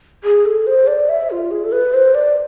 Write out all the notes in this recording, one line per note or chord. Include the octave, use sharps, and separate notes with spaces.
G#4
A4
C5
D5
E5
F4
G#4
A4
B4
C5
D5